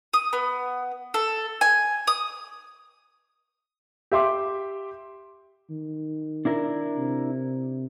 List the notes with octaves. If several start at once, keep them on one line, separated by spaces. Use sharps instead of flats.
D#6
B3
A4
G#5
D#6
G4 E5 C6 D6
D#3
D4 E4 A#4
C3